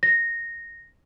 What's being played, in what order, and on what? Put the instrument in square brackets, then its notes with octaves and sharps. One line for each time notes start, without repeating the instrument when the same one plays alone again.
[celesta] A#6